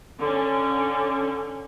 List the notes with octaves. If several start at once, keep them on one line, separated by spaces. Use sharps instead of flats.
D3 C#4